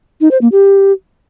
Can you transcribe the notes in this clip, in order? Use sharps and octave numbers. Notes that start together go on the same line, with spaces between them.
D#4
C5
A#3
G4